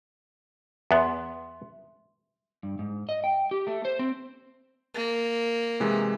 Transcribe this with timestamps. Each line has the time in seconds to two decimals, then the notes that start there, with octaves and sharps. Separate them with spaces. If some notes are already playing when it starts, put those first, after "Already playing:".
0.91 E2 B3 E5 C6
2.63 G2
2.79 G#2
3.09 D#5
3.24 G5
3.51 G4
3.67 A3
3.85 C5
3.99 C4
4.95 A#3
5.80 C3 E3 G#3